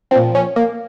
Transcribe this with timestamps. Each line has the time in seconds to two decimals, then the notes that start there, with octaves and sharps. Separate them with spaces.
0.11 A#2 F3 C4
0.35 C#4
0.56 A#3